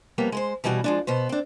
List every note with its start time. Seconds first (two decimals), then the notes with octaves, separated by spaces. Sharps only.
0.18 F2 G3 A#3 B3
0.32 G#3 A#4 C5
0.64 B2 E3 G3 C#4 F#4
0.84 F3 G#3 D4
1.07 B2 B3 C5
1.29 C4 D4